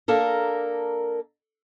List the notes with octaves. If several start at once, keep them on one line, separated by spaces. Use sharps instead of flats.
A#3 D4 A4 A#4